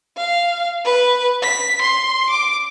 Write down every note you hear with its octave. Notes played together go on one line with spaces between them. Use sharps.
F5
B4
B6
C6
D6